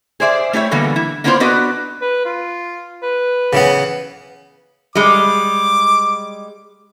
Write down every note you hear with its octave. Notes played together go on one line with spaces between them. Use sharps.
G#4 C5 D5 E5
A3 E4 G4 C#5
B2 D3 E3 G3 A#3 B3
E4
A#3 B3 D4 E4 F4 C5
B3 D4 F#4 B4 D5 D#5
B4
F4
B4
C#3 E3 B3
G3 G#3 D6